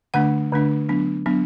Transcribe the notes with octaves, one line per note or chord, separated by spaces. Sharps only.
D3 A3 D4 F#5
D3 A3 D4
F#3 B3 D4
F#3 B3 D4